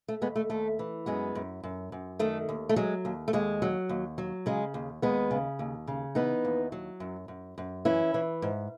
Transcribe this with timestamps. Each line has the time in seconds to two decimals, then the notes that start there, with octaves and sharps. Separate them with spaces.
0.08 A3
0.21 D#2 G#3 B3
0.36 A3
0.50 D#2 A3
0.79 E3
1.06 F#2 G#3 B3
1.35 F#2
1.64 F#2
1.92 F#2
2.19 D#3 A3
2.49 D#2
2.69 A3
2.76 F#3 G#3
3.05 D#2
3.28 A3
3.33 D#2 G#3
3.62 F#3
3.89 D#2
4.18 F#3
4.46 C#3 G#3
4.74 D#2
5.02 D#2 G#3 B3
5.31 C#3
5.59 D#2
5.87 C#3
6.15 E3 B3 D#4
6.45 D#2
6.72 F#3
7.00 F#2
7.28 F#2
7.58 F#2
7.85 E3 C#4 E4
8.14 E3
8.42 G#2